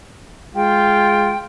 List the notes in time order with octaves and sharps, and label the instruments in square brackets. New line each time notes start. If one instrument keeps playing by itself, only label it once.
[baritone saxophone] G#3 [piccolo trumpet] F4 [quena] G5